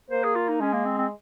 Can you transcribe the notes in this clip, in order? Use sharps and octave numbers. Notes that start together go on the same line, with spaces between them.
A#3 C5
G#4
F4
D#4
G#3 C#4
A#3
C4
C4